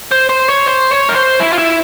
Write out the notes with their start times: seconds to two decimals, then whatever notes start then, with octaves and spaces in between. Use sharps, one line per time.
0.11 C5
0.29 C5
0.49 C#5
0.66 C5
0.91 C#5
1.09 A#4
1.16 C5
1.40 E4
1.53 F4
1.58 E4